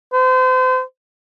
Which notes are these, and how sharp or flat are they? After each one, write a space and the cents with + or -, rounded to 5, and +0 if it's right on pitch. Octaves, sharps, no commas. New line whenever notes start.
C5 -35